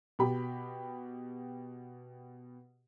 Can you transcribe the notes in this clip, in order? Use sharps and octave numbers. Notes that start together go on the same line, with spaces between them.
B2 G4 B5